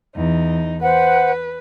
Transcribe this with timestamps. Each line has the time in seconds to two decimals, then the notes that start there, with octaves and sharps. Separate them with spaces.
0.15 E2 D#4
0.82 B4 C5 F#5